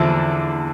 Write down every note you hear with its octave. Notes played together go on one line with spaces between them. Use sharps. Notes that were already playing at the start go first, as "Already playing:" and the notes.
Already playing: E2 D3 F3 E4